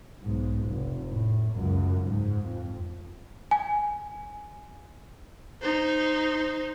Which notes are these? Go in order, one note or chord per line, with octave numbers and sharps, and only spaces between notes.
B1 G#2
F1
A2
C#2 F#2
G#2
F2
G#5
D#4 C5